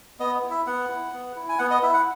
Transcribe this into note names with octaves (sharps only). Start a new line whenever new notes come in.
B3 D#5
E4
E5
B3 F#5
E4
B3
E4
G#5
B3 F#5
D#5
E4 E5
F#5